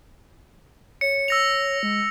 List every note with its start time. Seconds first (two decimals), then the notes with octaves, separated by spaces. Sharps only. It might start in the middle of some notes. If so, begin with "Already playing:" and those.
1.01 C#5 C#7
1.28 E6 A#6 F7
1.83 G#3